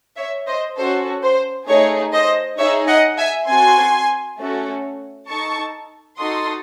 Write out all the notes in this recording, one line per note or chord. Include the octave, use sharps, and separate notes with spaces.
C#5 E5
C5 D#5
C#4 F#4 A4 C5
C5
A3 D#4 G#4 C#5
C5 D#5
D#4 G#4 C#5 E5
D#5 F#5
E5 G#5
C4 F#4 A4 G#5 C6
A3 C#4 F#4 A4
D#4 A4 A5 C#6
D#4 F#4 A4 C6 D#6